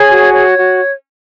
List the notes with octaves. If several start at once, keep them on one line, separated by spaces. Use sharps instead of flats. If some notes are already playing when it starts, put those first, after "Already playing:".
Already playing: G#4 C#5 G#5
F#4
C#5
F#4